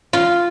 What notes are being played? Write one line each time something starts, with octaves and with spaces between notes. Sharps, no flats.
F4